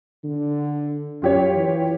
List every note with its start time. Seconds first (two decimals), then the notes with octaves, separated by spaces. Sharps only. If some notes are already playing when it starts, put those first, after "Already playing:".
0.24 D3
1.22 F#2 F4 G4 C#5
1.56 E3